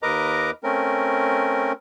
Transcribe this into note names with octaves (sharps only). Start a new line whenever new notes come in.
D#2 A#4 B4 D#5 A#5 D6
A3 C4 C#4 A#4